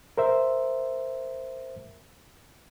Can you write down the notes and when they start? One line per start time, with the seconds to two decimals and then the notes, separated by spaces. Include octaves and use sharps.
0.18 A#4 C5 E5